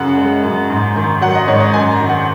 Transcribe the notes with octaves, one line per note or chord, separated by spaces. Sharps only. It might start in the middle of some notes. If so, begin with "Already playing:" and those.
Already playing: F#2 C#3 F#5
G#3
F#2
G#2
D#3
F#3 F#5
D#5
G#2 C#5
D#5
F#2 G#5
A#5
D#3
F#5